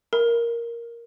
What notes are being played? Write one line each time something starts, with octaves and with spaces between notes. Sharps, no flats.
A#4